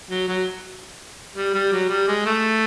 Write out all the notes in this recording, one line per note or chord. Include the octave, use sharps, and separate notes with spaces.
F#3
F#3
G3
G3
F#3
G3
G#3
A3